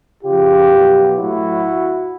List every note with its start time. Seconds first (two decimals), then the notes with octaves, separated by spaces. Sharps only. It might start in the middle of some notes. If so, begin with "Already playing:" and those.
0.24 C#3 F3 F4 G4
0.71 B2 F#3
1.17 A2 F#3 E4 F#4